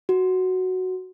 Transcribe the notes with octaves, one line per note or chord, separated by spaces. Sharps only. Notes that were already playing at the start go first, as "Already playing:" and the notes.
F#4